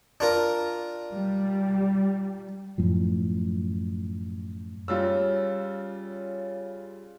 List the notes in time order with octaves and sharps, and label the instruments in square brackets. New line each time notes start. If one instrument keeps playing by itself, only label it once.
[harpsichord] D4 F4 A#4
[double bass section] G3
[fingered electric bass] F#2 A2 F3
[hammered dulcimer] C#3 [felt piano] G3 F4 E6